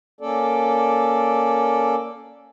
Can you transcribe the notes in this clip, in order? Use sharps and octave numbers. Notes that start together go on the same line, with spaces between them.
A#3 C#4 A4 D5